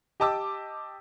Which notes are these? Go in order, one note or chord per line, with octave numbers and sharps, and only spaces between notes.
G4 D#5 A5 D6 E6